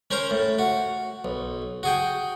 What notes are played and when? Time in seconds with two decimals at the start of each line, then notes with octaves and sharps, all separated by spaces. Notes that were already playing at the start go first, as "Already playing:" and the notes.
0.11 C#4 A#4 C5 A#5
0.31 A2
0.59 F#4
1.25 B1
1.83 F#4 G#4 G5